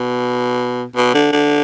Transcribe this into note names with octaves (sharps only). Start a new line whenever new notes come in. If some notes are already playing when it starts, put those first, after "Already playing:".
Already playing: B2
B2
D3
D3